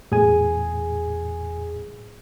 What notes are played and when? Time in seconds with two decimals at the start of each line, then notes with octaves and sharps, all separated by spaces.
0.12 E2 A2 G#4 G#5